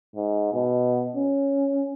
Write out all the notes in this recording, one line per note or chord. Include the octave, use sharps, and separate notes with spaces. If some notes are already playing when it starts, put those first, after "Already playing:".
G#2
B2
C#4